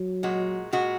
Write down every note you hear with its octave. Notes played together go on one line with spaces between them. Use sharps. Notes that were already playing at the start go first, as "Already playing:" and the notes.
Already playing: F#3
A#2 G#3 F#4
A#2 G#3 F#4